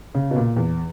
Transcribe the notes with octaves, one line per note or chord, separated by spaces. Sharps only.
C#3
B2
A#2
E2